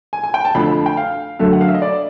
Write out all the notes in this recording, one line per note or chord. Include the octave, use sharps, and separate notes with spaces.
G#5
G#5
G5
A5
F2 D3 F3 A3 B5
G5
F5
F#2 D3 F#3 A3 E5
F#5
F5
E5
D#5
D5